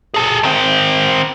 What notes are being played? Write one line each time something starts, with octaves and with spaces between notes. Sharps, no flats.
G#4 A4
D#3 C4